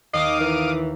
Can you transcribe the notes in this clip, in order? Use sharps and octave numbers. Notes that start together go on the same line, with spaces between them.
D#2 D#5 F5 D6 D#6
E3 A#4